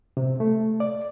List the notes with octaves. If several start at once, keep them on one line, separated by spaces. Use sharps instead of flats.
C3
A3
D5